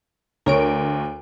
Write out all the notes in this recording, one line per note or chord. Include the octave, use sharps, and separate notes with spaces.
D2 A#4 C#5 D7